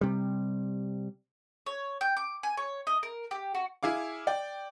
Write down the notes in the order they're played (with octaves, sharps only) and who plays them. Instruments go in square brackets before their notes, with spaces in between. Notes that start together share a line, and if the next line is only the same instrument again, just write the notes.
[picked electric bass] C3 G3
[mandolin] C#5
G5
D6
G#5
C#5
D#5
A#4
G4
F#4
[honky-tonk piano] E4 G#4 F5 D6
D5 G5